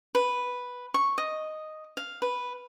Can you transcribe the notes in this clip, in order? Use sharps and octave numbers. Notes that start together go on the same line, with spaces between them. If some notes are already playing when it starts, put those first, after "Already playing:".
B4
C#6
D#5
F5
B4